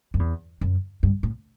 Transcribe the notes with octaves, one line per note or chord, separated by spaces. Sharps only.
F#2
E2
F#2
G2
A2